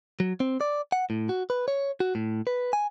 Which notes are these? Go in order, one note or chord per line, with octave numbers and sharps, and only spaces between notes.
F#3
C4
D5
F#5
A2
F#4
B4
C#5
F#4
A2
B4
G#5